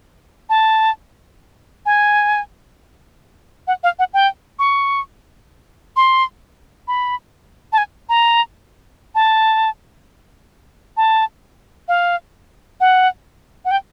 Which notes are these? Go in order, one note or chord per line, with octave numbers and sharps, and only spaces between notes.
A5
G#5
F#5
F5
F#5
G5
C#6
C6
B5
A5
G#5
A#5
A5
A5
F5
F#5
F#5
G5